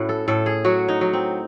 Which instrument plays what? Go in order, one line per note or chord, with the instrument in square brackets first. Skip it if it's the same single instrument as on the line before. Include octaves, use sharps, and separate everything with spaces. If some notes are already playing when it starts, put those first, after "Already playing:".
Already playing: [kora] A2 C#4 E4 F#4
A4
A2 A4
G#4
F#3 F#4
D#4
F#3
C4